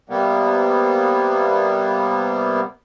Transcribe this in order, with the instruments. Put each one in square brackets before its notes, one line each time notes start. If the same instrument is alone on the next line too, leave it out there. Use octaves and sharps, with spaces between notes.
[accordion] C3 G3 A#3 B3